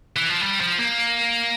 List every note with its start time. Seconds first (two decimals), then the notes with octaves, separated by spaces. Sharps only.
0.17 E3
0.29 F3
0.41 G3
0.60 F3
0.79 A#3